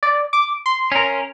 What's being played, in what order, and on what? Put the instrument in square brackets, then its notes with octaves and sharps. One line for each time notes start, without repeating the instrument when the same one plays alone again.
[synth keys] D5
D6
C6
[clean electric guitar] C#4 A#4